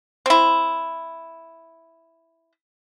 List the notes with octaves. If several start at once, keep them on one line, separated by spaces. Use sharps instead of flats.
C4 E4